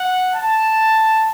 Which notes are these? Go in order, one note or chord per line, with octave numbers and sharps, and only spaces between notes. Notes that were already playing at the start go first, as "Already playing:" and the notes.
Already playing: F#5
A5